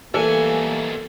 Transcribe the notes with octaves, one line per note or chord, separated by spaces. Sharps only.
B1 E3 G3 A3 A#3 A4 G#5